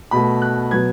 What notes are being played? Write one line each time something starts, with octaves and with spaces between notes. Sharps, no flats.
B2 A3 B5
F#6
B2 F#3 B3 G#6